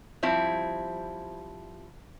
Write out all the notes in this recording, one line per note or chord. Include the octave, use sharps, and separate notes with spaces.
F3 G3 C4 E4